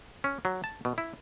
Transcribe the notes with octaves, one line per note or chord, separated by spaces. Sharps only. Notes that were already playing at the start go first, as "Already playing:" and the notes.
C#4
F#3
A5
B2
E4